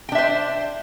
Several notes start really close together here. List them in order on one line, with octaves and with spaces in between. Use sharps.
G5 D4 E5 C5